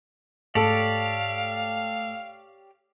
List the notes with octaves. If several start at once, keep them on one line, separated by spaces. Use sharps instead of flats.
G#2 A3 G4 A4 C#5 D5 F5 A5